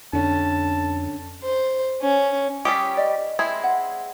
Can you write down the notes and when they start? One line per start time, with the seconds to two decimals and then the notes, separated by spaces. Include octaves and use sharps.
0.13 F2 D3 C#4 A5
1.41 C5
2.01 C#4
2.65 G3 C#4 G4 D#6 B6
2.97 D5 D#5
3.39 G#3 C4 E4 G#6
3.64 F#5